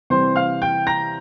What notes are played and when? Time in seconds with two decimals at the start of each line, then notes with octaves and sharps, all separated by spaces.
0.10 C3 E3 G3 C4 C5 C6
0.36 F5 F6
0.62 G5 G6
0.87 A#5 A#6